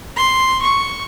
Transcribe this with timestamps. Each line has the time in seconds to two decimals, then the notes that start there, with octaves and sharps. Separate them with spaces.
0.17 C6
0.61 C#6